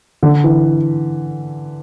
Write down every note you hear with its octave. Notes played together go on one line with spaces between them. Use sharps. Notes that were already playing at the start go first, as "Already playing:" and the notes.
D3
E3